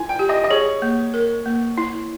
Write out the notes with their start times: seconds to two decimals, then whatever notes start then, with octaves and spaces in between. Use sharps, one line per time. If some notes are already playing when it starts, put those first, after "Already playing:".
Already playing: E4 G#5
0.09 G5
0.19 G4
0.29 D#5
0.44 D#5
0.51 G#4 C#5
0.82 A#3
1.14 A#4
1.46 A#3
1.78 E4